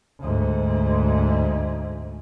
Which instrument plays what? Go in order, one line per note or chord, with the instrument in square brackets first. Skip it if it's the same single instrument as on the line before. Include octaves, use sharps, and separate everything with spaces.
[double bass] D2 G#2